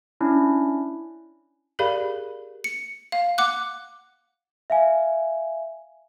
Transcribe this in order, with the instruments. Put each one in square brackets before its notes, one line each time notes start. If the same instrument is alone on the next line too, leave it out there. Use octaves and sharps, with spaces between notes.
[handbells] C#4 D4 E4
[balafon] G4 G#4 A#4 D5 F5 B5
[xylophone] C#7
F5
F#5 D6 F#6
[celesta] E5 F5 G#5